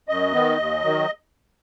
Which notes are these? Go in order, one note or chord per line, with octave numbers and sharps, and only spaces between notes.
F#2 D#5
D#3 B3
D#2
D#3 F#3